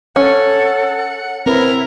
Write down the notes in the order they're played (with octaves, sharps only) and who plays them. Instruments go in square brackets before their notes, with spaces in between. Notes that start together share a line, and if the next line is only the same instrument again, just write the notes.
[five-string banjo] C#4 [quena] A4 [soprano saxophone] F#5
[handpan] C4 B4 [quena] E4 [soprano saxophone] A#4